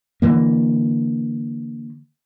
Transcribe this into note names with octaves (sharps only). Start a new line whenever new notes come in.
D3 E3 A#3